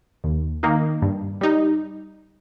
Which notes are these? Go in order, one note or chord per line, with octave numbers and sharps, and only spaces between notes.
D#2
D#3 A#3 D#4
G2
G3 D#4